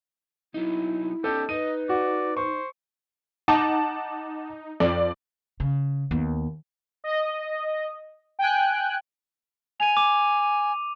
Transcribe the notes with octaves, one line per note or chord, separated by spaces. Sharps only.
F#3 D#4 E4
C#4 D#4 G4 A4
D#4 B4 D#5 D#7
F#4 D5
C5 C#6
D#4 F#5 A5 D6
F2 D5
C#3
D#2 B3
D#5
G5 G#5 F#6
G#5 D#7 F7
D6